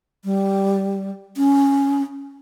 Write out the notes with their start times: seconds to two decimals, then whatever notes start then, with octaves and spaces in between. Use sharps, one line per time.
0.25 G3
1.37 C#4